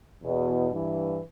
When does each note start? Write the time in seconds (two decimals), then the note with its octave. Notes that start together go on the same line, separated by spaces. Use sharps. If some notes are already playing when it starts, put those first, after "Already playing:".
0.22 E2 B2
0.71 G2 E3